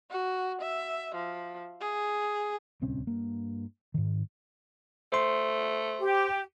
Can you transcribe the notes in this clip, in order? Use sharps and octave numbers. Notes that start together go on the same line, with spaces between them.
F#4
E5
F3
G#4
D1 C2 C4 C#4
G2 A#3
G#2 D#3
A3 C5 C6
G4